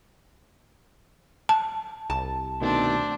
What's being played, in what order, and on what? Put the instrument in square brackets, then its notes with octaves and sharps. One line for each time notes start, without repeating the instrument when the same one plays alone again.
[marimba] A5
[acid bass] C2 [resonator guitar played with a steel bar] A5
[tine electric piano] B2 D#3 A3 [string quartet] C4 D4 D5